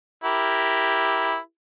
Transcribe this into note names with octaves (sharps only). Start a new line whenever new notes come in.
E4 G4 A#4